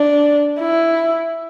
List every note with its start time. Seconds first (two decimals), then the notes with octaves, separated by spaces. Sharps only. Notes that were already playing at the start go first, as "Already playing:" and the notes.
Already playing: D4
0.59 E4